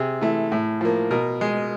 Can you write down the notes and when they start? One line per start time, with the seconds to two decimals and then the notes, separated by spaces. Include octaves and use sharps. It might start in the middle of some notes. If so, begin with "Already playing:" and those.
Already playing: C3 G#4
0.21 E3 A3
0.52 A2
0.81 F3 A#3
1.11 B2 A#4
1.41 G#3